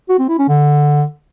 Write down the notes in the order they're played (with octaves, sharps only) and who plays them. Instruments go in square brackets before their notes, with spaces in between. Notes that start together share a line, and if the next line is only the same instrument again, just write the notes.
[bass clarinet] F#4
C4
E4
C#4
D3